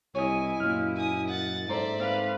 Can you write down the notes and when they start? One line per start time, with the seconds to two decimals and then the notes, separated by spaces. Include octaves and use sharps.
0.15 C2 E4 C#5 D#5 G#5
0.60 F#2 A#2 F6
0.96 G#5 D#6
1.29 F#5 A6
1.69 G#2 A4 C5 D5 E5 A#5
2.00 C4 B4 F5